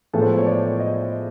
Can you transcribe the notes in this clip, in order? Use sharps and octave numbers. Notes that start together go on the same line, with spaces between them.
A2 F3 G#3 B3 A4
C5
C#5
D5
D#5